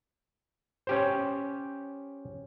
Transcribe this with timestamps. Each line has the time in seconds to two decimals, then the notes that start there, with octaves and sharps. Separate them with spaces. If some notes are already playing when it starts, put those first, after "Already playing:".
0.87 C#4 G4 C5